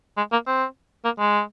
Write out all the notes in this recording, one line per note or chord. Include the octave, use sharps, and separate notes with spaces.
G#3
A#3
C4
A#3
G#3